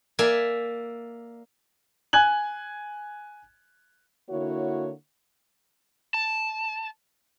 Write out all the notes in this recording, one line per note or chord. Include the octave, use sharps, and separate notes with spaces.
A#3 D5 E5 G#5
G#5 F#6 G#6 F#7
D3 A#3 E4 F#4 C#5
A5